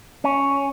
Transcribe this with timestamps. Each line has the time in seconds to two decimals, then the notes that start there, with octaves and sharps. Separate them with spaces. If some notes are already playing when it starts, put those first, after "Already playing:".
0.24 C#4